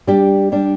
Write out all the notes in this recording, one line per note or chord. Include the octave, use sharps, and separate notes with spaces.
G3 D4 G4 D5
G3 D4 G4 D5